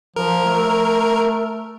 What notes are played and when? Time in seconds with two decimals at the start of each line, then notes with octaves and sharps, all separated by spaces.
0.16 F3 A#4
0.46 A3